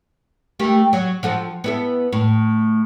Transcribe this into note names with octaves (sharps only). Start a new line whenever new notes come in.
A3 A#3 G4
F#3
F3 F#4 A4
B3 E4 A4
A2